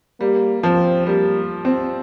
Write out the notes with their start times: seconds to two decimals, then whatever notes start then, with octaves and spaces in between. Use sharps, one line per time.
0.21 G3 A#3
0.63 F3 C4
1.07 G3 A#3
1.65 C4